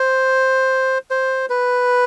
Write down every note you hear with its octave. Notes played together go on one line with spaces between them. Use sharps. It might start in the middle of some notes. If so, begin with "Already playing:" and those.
Already playing: C5
C5
B4